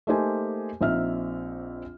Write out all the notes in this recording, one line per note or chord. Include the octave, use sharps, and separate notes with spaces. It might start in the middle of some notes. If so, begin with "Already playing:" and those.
A3 A#3 D#4 G4 C5 G#5
A#1 C4 D#4 E5 F6